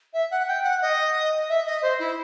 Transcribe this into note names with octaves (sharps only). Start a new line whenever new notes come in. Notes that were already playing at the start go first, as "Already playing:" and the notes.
E5
F#5
G5
F#5
D#5
E5
D#5
C5
E4